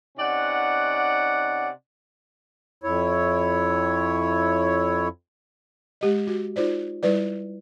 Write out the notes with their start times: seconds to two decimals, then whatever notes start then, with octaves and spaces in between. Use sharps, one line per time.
0.18 C3 C#4 D#4 D5 F#5
2.83 F2 E4 C#5
6.01 G#3 G4 D#5
6.27 F#4
6.56 D#4 F4 C5 D5
7.03 G3 E4 B4 D5